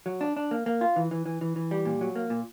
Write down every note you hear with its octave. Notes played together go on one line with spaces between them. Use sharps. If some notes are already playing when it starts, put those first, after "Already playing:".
F#3
D4
D4
A#3
A#3
F4
E3
E3
E3
E3
E3
G3
A#2
F#3
A#3
A#2